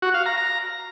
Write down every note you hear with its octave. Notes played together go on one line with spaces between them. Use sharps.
F#4
F5
A#5
A#5